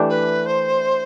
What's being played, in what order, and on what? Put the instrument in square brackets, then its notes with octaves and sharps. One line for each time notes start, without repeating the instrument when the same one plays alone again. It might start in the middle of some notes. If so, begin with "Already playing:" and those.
Already playing: [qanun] E3 A3 D4 G4
[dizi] B4
C5